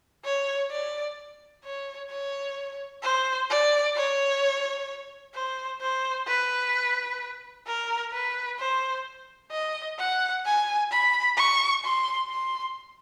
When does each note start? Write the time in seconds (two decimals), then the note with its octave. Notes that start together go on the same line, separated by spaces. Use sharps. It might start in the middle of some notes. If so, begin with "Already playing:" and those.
0.25 C#5
0.71 D5
1.64 C#5
2.10 C#5
3.03 C5
3.50 D5
3.96 C#5
5.35 C5
5.81 C5
6.28 B4
7.67 A#4
8.13 B4
8.60 C5
9.51 D#5
9.99 F#5
10.45 G#5
10.92 B5
11.37 C#6
11.84 C6
12.30 C6